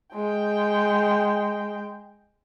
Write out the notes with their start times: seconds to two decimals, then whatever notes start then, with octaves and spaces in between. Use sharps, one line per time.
0.14 G#3 G5